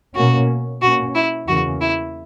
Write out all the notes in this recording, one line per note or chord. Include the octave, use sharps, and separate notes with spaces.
B2 A#3 C#4 F#4
B2 A#3 C#4 F#4
E4
E2 C#3 E3 A#3 C#4 F#4
E4